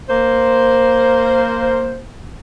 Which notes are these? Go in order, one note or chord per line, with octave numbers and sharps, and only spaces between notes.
A#3 C5